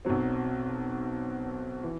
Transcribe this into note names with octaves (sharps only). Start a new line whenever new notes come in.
B1 B2 F#3 C4
E3